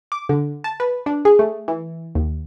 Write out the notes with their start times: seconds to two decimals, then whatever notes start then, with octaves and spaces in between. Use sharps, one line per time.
0.12 D6
0.29 D3
0.64 A5
0.80 B4
1.06 D4
1.25 G#4
1.39 A3
1.68 E3
2.15 D#2